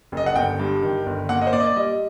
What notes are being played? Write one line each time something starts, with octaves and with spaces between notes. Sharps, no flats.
F#1 D#5
F#5
G1 G5
G2
D#3
G1
A#3 F#5
D#5
C5
A#2 D5
D#5
D5
G3 D#5